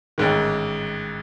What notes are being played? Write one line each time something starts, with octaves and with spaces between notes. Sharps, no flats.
A1 G#2 D#3